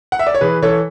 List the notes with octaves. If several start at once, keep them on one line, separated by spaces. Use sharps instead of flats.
F#5
E5
D5
C#5
E3 G#4 B4
E3 A4 C#5